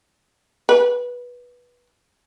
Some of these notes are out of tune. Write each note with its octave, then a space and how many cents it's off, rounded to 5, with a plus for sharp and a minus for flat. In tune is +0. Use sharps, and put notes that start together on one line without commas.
B4 -15